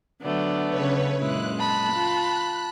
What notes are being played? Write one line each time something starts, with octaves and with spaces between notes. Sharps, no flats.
D3 F#3 A3 B3 D5
C#3 B4 C#5
F#2 A#2 G#3 E4 F#6
A5 B5 F#6
F4